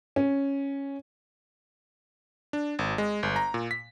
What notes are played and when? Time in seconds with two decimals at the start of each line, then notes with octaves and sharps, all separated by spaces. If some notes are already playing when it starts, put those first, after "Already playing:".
0.16 C#4
2.53 D4
2.79 G#1
2.98 G#3
3.23 G1
3.36 A#5
3.54 A#2
3.71 B6